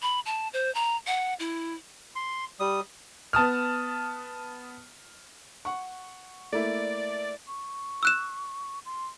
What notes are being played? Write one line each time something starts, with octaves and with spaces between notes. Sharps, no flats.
B5
A5
C5
A#5
F#5
E4
C6
G3 D#6
B3 A5 D#6 F6
F#5 C#6
A3 A#3 E4 D5
C#6
E6 F#6 E7
C6